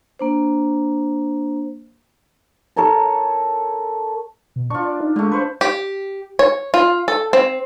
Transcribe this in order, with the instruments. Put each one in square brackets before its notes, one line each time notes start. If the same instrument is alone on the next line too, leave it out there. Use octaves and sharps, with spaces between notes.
[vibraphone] A#3 D4 C5
[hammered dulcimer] A4 A#4 C#5 A5
[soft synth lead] B2
[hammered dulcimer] D4 F4 [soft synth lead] C#6
[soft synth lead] D5
D#4
[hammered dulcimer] D3 A3 [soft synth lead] G#3
[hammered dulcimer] B4 C5 [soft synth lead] C#6
[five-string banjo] G4
C#5
F4
A4
C4